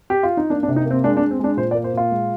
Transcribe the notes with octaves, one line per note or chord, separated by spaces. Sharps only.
G4
F4
D#4
A#3 D4
D4
C3
D#4
A#3 C4
G#3 D4
D4
G#3
C4
G#3 D4
A#2 C5
D5
A#3
C5
A#2 F4
G#3